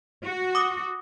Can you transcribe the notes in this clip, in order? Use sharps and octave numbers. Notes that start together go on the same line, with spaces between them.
F#4
D6 D#6